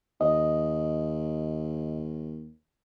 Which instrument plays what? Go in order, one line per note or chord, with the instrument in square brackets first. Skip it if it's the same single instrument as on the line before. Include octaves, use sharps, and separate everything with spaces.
[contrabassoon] D#2 [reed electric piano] D#5